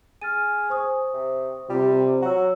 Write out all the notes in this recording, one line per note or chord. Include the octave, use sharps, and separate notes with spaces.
G#4 F6 A6 D#7
C5 C#6 D#6
C3
C3 G3 F4 G4
F#3 F#4 A#5 E6